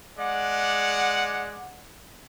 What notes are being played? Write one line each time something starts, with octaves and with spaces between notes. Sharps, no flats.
G#3 D5 F#5